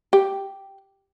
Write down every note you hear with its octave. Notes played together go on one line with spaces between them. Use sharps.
G4